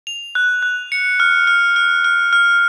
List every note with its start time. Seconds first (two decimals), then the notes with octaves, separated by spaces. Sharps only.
0.07 F7
0.35 F#6
0.62 F#6
0.92 C#7
1.20 F6
1.47 F6
1.76 F6
2.04 F6
2.33 F6